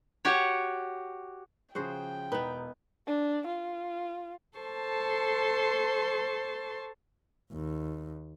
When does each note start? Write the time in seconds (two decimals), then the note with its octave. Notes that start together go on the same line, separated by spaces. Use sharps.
0.25 F#4 G4 C#5
1.75 C#3 F3 F#4 G#4 C5 G5
2.32 E1 B3 D#4 B4
3.07 D4
3.47 F4
4.57 A4 C5 A5 C6 C#6
7.52 D#2